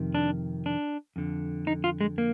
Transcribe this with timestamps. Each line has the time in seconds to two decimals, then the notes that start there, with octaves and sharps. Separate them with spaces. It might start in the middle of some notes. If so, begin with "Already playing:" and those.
Already playing: F2 C3 D#3
0.15 D4
0.66 D4
1.16 F2 D3
1.67 D#4
1.84 F4
2.01 G#3
2.18 A#3